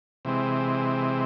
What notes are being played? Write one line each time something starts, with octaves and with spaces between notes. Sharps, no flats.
C3 E3 G#3 C4